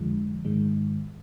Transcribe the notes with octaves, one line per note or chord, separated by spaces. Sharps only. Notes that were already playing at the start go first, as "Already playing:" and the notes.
Already playing: F2 D3 F3 G#3
G#2 D#3 G#3